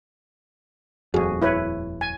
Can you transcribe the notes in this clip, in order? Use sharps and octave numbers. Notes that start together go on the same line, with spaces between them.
D#1 F2 F#4 G#4
E4 B4 C#5
G#5